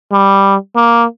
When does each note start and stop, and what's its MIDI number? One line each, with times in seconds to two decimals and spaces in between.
0.12 0.56 55
0.76 1.04 58